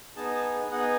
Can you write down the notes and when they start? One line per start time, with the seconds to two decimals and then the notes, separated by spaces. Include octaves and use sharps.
0.17 B3 D#4 G#4 A5
0.35 A5
0.71 B3 D#4 G#4 F#5